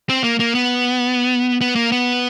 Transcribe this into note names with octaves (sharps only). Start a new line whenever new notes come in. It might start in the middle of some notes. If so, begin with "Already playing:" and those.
C4
A#3
A#3
B3
B3
A#3
B3